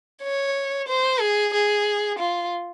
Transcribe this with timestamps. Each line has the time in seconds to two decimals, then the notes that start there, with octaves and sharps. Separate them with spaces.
0.23 C#5
0.88 C5
1.20 G#4
1.53 G#4
2.19 F4